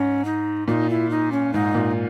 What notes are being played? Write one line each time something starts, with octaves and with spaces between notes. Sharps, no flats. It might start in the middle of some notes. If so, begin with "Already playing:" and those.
Already playing: G#2 C#4
D#4
A#2 D#4
E4
D#4
C#4
G#2 D#4
A#2